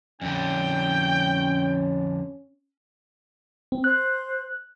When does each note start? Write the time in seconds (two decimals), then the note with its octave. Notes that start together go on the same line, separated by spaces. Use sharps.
0.22 F2 D3 C#4 G5
3.72 C4
3.84 C5 F#6